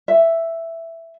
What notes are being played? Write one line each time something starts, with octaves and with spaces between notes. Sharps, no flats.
E5